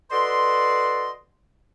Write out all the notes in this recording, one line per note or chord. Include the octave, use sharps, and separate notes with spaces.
F#4 A4 B4 D5 D#5 C6